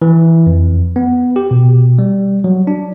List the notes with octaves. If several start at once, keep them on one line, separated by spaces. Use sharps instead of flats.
E3
F2
B3
G4
B2
G3
F#3
D4